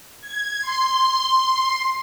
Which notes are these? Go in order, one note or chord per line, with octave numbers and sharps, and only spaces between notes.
G#6
C6